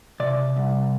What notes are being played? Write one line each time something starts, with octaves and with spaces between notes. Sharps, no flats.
C3 D5
C2